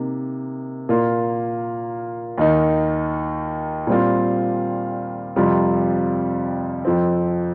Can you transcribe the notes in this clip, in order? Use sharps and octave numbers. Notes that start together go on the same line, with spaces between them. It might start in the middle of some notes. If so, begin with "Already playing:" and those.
Already playing: C3 A#3 D#4
A#2 A#3 F4
D#2 D#3 A#3 D#4
A#2 G3 C4 F4
F2 C3 G3 C4 F4
F2 F3 C4